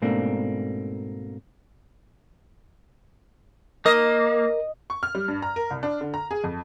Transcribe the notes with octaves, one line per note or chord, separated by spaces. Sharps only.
G#2 B2 A3 A#3 C4 D4
A#3 A#4 D#5
C#6
F6
G3
G2
A#5
A#4
C2
D4
D3
A#5
G#4
F2